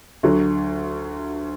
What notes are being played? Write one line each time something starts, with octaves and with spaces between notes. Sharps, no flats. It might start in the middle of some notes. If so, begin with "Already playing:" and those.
D2 D3 F#3